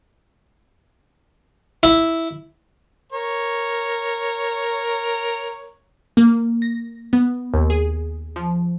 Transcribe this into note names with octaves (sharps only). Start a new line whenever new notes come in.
E4
A#4 C#5
A#3
A#6
B3
D#2
G#4
F3